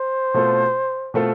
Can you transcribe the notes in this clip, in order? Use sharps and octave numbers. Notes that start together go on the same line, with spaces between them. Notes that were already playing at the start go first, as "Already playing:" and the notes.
Already playing: C5
B2 A3 C4 F4 A4
B2 A3 C4 F4 A4